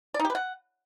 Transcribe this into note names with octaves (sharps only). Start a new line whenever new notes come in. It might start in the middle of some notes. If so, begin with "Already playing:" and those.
D5
D#4
G4
B4
F#5